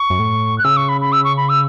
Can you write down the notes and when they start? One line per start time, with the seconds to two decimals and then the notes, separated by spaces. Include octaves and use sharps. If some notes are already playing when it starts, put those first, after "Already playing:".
Already playing: C#6
0.10 F#2
0.19 A2
0.58 F#6
0.64 C#3 E6
0.77 C#6
0.89 B5
1.01 B5
1.12 E6
1.24 C#6
1.37 B5
1.49 E6